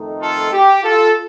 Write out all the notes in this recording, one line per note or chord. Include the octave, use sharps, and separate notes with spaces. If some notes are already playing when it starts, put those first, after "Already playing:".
Already playing: F2 D#3 A3 D#4
F4 A4
G4
F4 A4